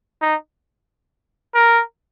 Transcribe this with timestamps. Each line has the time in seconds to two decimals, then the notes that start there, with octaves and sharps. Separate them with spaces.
0.22 D#4
1.55 A#4